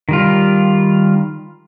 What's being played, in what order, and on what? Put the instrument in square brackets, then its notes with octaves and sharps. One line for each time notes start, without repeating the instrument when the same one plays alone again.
[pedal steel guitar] D#3 G3 F4